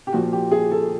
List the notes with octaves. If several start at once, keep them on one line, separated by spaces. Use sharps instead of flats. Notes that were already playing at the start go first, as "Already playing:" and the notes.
G4
A#2 F3 F#4
G4
G#4
A4